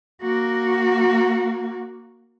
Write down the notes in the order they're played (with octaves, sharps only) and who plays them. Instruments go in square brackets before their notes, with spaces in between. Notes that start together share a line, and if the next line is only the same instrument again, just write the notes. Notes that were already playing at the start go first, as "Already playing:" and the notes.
[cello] A#3 F#4